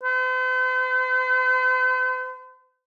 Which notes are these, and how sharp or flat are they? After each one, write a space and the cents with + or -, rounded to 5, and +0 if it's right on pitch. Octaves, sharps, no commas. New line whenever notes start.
C5 -45